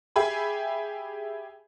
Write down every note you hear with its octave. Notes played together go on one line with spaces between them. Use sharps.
G4 G#4 E5 G#5 B5